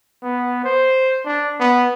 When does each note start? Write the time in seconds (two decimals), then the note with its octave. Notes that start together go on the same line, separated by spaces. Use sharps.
0.23 B3
0.64 C5
1.26 D4
1.60 B3